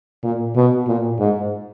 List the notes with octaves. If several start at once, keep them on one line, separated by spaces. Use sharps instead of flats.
A#2
B2
A#2
G#2